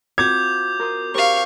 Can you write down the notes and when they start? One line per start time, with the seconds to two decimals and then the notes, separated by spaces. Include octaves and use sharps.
0.18 C4 F4 F#4 D6 G6 G#6
0.79 A#4 C6 D#6
1.15 G4 A#4 C5 F5 C#6